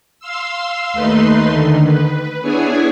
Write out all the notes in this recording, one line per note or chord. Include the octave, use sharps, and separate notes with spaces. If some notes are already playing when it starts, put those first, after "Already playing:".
F5 C6 E6
D#2 A3 D#4 B4 C6
D3 D#3
B4
B3 D4 E4 G#4 C#5 G#5